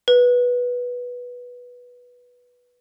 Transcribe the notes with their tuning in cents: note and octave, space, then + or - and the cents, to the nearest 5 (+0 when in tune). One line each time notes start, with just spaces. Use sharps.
B4 -10